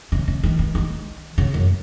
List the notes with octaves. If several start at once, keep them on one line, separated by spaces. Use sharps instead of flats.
C#3
C#3
D#3
E3
D#3
C#3
F#2